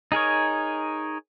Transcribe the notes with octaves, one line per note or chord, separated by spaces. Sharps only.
D#4 G#4 A#4 C#5